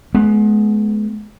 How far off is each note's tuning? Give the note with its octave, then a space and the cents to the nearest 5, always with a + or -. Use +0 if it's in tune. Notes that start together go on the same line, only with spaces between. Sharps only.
G#3 +35 B3 +0